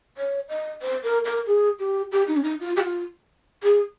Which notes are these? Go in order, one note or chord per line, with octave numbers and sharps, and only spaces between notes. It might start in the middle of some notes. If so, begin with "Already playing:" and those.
C#5
D#5
C5
A#4
A#4
G#4
G4
G4
D#4
C#4
D#4
F4
G4
F4
G#4